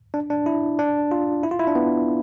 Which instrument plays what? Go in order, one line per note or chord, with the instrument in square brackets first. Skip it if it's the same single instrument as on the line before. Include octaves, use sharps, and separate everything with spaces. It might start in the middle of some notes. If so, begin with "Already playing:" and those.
[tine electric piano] D4
D4
E4
D4
F4
E4
F4
E4
D4
B3